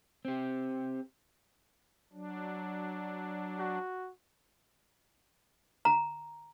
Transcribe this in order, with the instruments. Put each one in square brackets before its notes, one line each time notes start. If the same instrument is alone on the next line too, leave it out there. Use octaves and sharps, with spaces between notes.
[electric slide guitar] C4 G4
[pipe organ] F#3 D4
[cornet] F#4
[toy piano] A#5